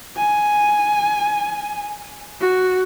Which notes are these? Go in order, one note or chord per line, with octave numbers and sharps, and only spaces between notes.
G#5
F#4